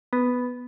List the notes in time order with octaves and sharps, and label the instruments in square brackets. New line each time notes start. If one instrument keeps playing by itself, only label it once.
[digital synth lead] B3